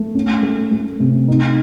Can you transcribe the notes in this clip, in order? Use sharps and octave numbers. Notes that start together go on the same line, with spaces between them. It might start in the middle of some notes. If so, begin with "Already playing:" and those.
Already playing: A3
C#4
A3
A3
C3
D#4